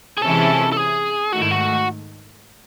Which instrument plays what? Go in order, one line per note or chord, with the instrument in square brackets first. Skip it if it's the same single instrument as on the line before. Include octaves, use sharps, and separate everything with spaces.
[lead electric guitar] G#4
[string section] C3 E3 G#3 C#4 E4 [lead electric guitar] A4
[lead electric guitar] A4
G#4
[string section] G#2 D#3 A3 [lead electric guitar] F#4
[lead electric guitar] E4
F#4